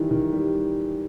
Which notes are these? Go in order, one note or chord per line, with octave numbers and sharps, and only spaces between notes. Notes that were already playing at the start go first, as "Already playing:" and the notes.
Already playing: D#3 E3 G3
D#3
G3